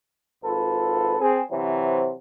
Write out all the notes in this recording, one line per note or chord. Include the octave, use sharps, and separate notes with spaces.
G#1 F4 A4 B4
C4 G#4
C3 E3 F#3 C5